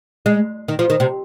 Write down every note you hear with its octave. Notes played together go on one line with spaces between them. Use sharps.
G#3
D#3
F3
D#3
C3